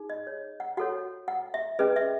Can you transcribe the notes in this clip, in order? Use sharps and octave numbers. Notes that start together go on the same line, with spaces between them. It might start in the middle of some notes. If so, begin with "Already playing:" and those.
Already playing: D#4 G#4
D#5
C#5
F#5
F#4 A4 C#5 F#5
F#5
E5
C#4 G#4 B4 D#5
E5